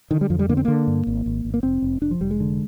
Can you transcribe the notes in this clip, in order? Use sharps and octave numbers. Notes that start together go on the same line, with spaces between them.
D3 D#3
G3
F2 F3
G3
D3 A#3
C4
D3 A#3
G2
G#1
G#1
G#1
A#3
F1 C4
F1
F1 D4
F3
F1 G3
G#3
D3